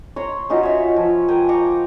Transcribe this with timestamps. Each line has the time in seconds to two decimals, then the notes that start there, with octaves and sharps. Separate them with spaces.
0.16 C#5 A#5 C6
0.50 C#4 D#4 F4 F#4
0.63 C#5 E5
0.96 F3
1.28 A#4 G5 G#5 A#5
1.49 A#5 C#6 D6